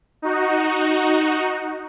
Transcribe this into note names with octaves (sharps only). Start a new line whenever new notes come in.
D#4 F#4